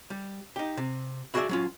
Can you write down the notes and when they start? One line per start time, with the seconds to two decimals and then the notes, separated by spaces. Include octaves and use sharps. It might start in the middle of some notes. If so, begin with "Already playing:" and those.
0.10 G3
0.56 D#4 G4
0.77 C3
1.34 E4 F#4 G#4 A#4 D5 E5
1.49 F#3 C#4 F4